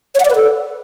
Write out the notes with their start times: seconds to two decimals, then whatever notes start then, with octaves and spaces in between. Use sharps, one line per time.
0.15 C#5
0.20 F#5
0.25 D5
0.30 B4
0.35 A4